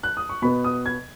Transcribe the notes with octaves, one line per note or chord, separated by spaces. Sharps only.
F#6
D#6
C#6
B2 B3 B5
D#6
G#6